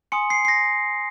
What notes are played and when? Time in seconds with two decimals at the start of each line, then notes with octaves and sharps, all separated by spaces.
0.12 G#5 C6 D#6 C#7
0.30 C7
0.45 C7
0.48 A#6